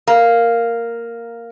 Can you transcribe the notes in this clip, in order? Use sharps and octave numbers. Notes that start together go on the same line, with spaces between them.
A#3